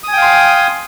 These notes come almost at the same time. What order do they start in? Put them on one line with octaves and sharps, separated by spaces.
D#6 G#5 G5 F5 C6